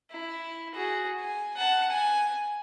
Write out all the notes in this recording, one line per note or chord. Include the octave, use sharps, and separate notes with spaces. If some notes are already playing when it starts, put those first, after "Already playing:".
E4
F#4 G#4
G#5
F#5 A5
G#5